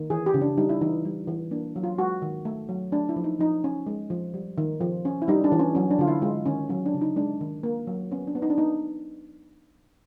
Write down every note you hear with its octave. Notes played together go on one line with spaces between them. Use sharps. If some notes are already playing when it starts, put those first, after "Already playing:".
Already playing: D#3
E3 G#4
G4
C#3
D4
G3 D#4
E4
E3 D#4
G3
E3
A#3 D4
F#3
F4
G#3 F#4
D#3
A3
F#3
A3 D4
E4
F3
D#4
F3 D#4
C#4
G#3
F3
G3
D#3
F3
C#4
E4
G3 D#4
D4
E3
C#4
F#3 C#4
D4
D3 F4
E4
G#3 F4
D#3 C#4
F#3 C#4
D4
C#3
D#4
G#3 D4
D#3
A#3
F#3
B3 C#4
D4
B3
D#4
D4
B3 D#4